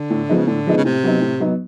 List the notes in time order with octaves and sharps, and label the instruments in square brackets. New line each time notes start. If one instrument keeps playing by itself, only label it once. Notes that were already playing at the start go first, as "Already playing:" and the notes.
Already playing: [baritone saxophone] D3
[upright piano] A2
F3 G#3 B3 D#4
[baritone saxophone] C#3
[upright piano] A2 [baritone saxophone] D3
[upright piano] F3 G#3 B3 D#4
[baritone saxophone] C#3
[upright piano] A2 [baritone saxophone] C3
[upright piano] F#3 B3 D#4
A2
F#3 B3 D#4